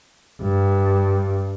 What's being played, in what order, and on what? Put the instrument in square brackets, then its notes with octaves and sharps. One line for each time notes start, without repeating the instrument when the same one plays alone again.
[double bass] G2